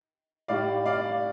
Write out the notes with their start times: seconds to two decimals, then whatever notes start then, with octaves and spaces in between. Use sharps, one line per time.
0.48 A2 G3 D5 F5
0.85 D5 F5